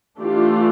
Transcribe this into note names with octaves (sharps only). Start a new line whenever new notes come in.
E3 A3 D4 F4 G4